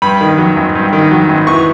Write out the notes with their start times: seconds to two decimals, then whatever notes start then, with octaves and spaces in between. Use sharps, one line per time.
0.02 G2 B5
0.21 D#3
0.38 F#3
0.56 G#1
0.75 G2
0.93 D#3
1.11 F#3
1.29 G#1
1.47 E3 C#6